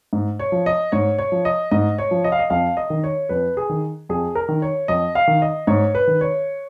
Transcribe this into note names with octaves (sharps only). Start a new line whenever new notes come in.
G#2
C#5
F3
D#5
G#2 C#5
C#5
F3
D#5
G#2 D#5
C#5
F3
D#5
F5
D#5
F2 F5
D#5
D#3
C#5
F2 B4
G#4
D#3
F2 G#4
A#4
D#3
C#5
F2 D#5
F5
D#3
D#5
G#2 C#5
B4
D#3
C#5